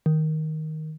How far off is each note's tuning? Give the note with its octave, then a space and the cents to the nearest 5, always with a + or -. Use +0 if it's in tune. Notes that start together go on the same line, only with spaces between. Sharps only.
D#3 +5